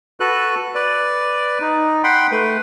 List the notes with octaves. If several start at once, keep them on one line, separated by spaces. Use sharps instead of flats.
F#4 A4 B4 F#6
B4 D5
D#4
F#5 G5 B5 C6
A3 B4